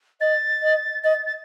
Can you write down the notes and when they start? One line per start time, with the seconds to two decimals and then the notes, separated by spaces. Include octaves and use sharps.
0.20 D#5 A6
0.62 D#5
1.03 D#5 A6
1.26 A6